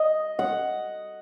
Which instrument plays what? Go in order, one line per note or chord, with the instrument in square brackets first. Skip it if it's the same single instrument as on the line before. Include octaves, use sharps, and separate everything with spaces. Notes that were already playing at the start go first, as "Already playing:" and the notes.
Already playing: [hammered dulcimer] D#5
F#5